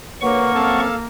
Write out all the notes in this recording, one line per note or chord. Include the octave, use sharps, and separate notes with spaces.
D2 A#3 B4 C#5 F#5 C#6
F#2 C4 A4 F5 A5